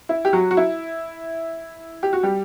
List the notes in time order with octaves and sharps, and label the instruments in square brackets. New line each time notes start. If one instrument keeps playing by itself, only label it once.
[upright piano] E4
G4
F#3 F#4
F#4
E4
G4
F#4
G3 G4